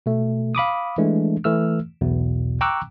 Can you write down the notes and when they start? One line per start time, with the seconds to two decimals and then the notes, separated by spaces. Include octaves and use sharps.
0.06 B2 A3
0.55 F5 B5 D6 D#6
0.98 E3 G#3 A3 D4
1.44 E3 A3 E6 F6
2.01 B1 E2 B2
2.61 G5 A#5 C#6 D6 E6 F#6